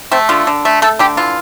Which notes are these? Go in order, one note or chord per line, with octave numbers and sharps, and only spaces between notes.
A3 C4
D3 F4
D3
A3
A3 A4
D3 G4
E3 F4